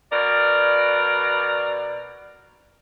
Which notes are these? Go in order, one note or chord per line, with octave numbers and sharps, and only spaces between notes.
B2 A#4 D5